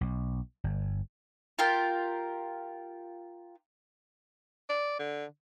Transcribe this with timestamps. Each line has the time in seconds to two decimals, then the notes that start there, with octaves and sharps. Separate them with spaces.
0.01 B1
0.64 G1
1.59 F4 G4 A#4
4.69 D5
4.99 D3